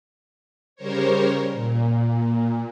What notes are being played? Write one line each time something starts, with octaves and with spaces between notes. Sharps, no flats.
C#3 G3 A#4 C5 C#5
A#2